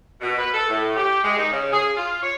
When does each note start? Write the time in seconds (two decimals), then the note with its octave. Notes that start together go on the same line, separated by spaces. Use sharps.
0.21 B2
0.38 B4
0.54 A4
0.69 A2
0.96 G4
1.24 G#3
1.38 D#4
1.52 C#3
1.73 G#4
1.97 F4
2.23 C#5